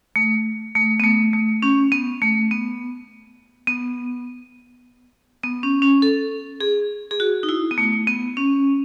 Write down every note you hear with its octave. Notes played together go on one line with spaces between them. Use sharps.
A3
A3
B3
A3
A3
C#4
B3
A3
B3
B3
B3
C#4
C#4
A4
G#4
G#4
F#4
D#4
E4
B3
A3
B3
C#4